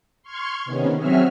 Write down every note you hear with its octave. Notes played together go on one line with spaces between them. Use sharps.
C6 C#6 F6 G#6
C3 D#3 B3 C#4
F#3 C4 F#4 G#4 E5 F6